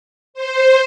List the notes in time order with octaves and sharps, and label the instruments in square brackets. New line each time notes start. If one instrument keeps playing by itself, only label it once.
[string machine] C5